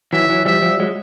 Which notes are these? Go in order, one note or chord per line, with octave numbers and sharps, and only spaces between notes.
E3 F#3 E5
E3 F#3
F3 G3 E5
F3 G3
F#3 G#3